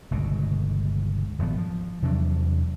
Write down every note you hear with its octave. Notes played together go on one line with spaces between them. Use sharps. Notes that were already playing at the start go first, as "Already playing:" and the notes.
G1 C#2 B2
D#1 G#1 F3 B3
F3
E2 C3 F#3 D4